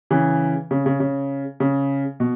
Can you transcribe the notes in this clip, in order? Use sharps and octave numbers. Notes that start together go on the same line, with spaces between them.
C#3 E3
C#3
C#3
C#3
C#3
B2